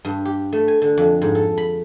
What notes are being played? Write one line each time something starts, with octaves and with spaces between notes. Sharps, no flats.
G2
G4
A3
G#5
D3
F2
G#2
A4
B5